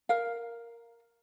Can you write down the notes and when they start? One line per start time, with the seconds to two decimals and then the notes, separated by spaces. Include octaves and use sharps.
0.09 A#4 F5